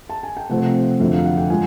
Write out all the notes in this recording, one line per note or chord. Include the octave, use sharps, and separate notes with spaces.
A5
G#5
G5
C3 F3 A3 C4 F#5
F2 D3 F#3 E5
F5
F#5
G5
F3 G#3 G#5